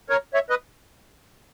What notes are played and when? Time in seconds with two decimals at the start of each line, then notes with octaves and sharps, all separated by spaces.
0.10 A#4 C#5
0.34 C#5 E5
0.50 B4 D#5